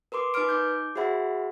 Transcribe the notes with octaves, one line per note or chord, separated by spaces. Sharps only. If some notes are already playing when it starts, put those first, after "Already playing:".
A#4 B4 C6 D6
D#4 B4 B5 D6 F6 D7
D#4 D6 G6
F#4 G#4 C5 E5 F#5 B5